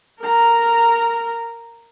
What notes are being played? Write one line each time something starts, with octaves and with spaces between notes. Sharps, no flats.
A#4 A#5